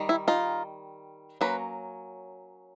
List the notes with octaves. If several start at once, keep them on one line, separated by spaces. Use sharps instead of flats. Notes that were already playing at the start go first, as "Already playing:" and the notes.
Already playing: D#3 G3
E4
D#4 F4
F#3 A#3 C#4 B4